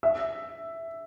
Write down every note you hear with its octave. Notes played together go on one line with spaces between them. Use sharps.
E5